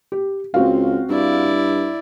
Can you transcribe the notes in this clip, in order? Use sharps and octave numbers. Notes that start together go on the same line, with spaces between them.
G4
C#2 C4 F#4 F5
G2 E4 D5